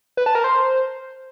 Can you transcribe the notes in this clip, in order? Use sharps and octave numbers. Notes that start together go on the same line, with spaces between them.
B4
A5
A#4
C5